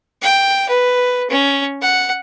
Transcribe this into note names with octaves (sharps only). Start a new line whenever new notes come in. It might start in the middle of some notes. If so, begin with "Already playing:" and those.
G5
B4
C#4
F#5